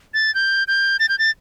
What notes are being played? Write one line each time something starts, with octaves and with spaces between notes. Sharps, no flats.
A6
G6
G6
A6
G6
A6